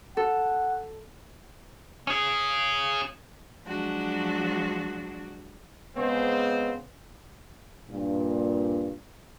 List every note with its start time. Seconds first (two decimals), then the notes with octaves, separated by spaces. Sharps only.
0.17 A4 F#5
2.07 C#4 G#4
3.64 F3 F#3 G#3 D4 F#4
5.96 C#3 G#3 B3 C4 C5
7.90 G2 A#2